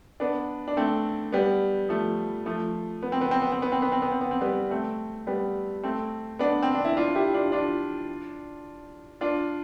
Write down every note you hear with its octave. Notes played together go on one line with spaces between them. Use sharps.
B3 D4
D4
A3 C4
G3 B3
F3 A3
F3 A3
B3
C4
B3
C4
B3
C4
B3
C4
B3
C4
B3
C4
B3
C4
G3 B3
A3 C4
G3 B3
A3 C4
B3 D4
C4
D4
E4
D4 F4
E4 G4
D4 F4
D4 F4
D4 F4